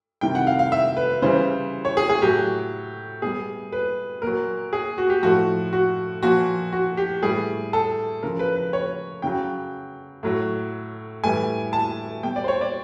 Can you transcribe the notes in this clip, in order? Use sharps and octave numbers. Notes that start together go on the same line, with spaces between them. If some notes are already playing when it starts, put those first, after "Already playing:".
C3 D#3 G3 G5
F#5
F5
F5
E5
B4
C#3 E3 G3 C5
C#5
G#4
G#4
A2 F#3 G4
B2 G3 G#4
B4
A#2 F#3 A#4
G#4
F#4
G4
A2 F3 F#4
F#4
A#2 F3 F#4
F#4
G4
A2 E3 G3 G#4
A4
C#3 F3 A#4
B4
B4
C#5
C#3 F#3 G5
A2 F#3
A2 E3 G3 G#5
A5
B2 G3 G5
D5
C5
C#5
D5